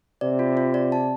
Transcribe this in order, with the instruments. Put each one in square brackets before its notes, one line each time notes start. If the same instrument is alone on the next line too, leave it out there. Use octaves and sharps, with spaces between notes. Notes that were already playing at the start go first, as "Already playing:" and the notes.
[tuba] C3 [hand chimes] D5
[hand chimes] F4
F4
D5
A5